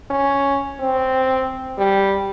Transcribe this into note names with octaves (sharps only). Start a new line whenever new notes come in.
C#4
C4
G3